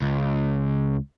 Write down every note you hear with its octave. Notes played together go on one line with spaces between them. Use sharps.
C#2